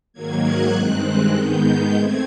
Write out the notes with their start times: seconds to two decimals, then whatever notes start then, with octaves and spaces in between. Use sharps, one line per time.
0.13 G#2 D#3 F#3 A#3 G#6
0.44 F#6
0.74 G2 D#3 G#3 C4 F#6
1.35 G#2 D#3 G#3 B3 G6
1.96 A3 C4 G#6